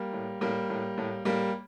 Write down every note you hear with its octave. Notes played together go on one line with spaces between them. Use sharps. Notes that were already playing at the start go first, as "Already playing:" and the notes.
Already playing: G3 A#3
A2
A2 G3 A#3
A2
A2
A2 G3 A#3